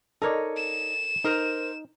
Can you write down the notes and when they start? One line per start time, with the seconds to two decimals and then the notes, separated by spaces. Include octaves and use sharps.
0.22 D#4 A4 A#4 C#5 D5
0.56 E7
1.24 D#4 A#4 C5